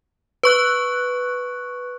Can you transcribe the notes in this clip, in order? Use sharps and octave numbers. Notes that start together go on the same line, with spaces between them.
B4 C#6 F#6